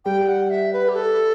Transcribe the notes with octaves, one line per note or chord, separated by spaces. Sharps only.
G3 G5
F#5
E5
B4
G4
A4